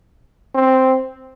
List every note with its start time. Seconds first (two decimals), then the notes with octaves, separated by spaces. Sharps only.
0.55 C4